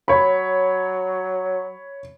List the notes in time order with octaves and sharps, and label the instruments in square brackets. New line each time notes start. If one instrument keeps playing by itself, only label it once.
[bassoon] F#3 [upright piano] C#5 B5